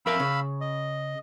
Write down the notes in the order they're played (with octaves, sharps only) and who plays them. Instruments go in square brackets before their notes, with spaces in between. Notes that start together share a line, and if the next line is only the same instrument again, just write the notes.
[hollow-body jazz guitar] F2 A#4 E5 [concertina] F5 B5 E6
[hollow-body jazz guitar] C#3
[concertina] D#5